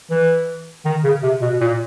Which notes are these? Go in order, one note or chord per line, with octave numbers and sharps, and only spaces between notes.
E3
D#3
C#3
C3
B2
A#2